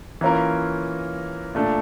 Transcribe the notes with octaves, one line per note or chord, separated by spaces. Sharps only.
E3 A#3 C#4 F4 A#4
A#2 A3 D4